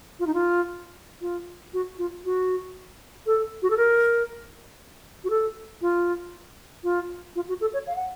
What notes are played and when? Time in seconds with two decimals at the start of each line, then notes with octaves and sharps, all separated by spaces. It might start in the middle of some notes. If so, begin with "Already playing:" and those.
0.20 F4
0.27 D#4
0.34 F4
1.21 F4
1.74 F#4
1.98 F4
2.25 F#4
3.26 A4
3.62 F#4
3.70 A4
3.77 A#4
5.24 F#4
5.30 A4
5.82 F4
6.84 F4
7.36 F4
7.49 F#4
7.61 A4
7.74 C#5
7.87 F5
7.96 F#5